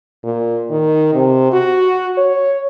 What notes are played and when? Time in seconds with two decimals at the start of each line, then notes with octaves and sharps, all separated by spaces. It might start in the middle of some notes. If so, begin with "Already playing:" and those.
0.24 A#2
0.71 D#3
1.14 C3
1.52 F#4
2.17 C#5